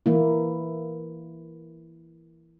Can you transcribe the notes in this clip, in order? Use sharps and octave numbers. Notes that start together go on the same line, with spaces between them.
E3 A#3 E4